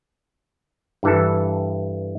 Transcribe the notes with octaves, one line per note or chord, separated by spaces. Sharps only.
G2 E3 A4